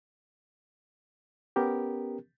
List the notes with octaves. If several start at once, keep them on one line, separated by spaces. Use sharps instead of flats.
B3 C#4 G4 A#4